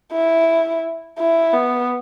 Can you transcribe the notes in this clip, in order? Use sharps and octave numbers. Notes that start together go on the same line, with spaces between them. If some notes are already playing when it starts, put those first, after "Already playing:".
E4
E4
B3